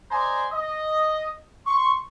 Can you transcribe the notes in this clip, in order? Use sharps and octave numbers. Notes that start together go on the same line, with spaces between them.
C5 D5 D#5 G#5 A#5 C6
D#5
C6 C#6